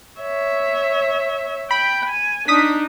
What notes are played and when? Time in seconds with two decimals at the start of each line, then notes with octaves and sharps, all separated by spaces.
0.20 C#5 E5
1.71 G5 B5
2.09 G#5
2.48 D4 D#4 D#6 B6